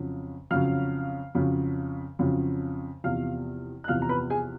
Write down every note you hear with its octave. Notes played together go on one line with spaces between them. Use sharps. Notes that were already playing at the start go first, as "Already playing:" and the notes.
Already playing: F2 C#3 F#3
F2 C#3 F#3 F5 F6
F2 C#3 F#3
F2 C#3 F#3
E2 C3 F3 F5 F6
F#6
E2 C3 F3 F5 F6
A#5
B4 B5
G#4 G#5